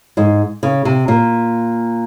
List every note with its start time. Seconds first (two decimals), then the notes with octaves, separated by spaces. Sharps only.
0.17 G#2 G#3
0.63 C#3
0.85 C3
1.08 A#2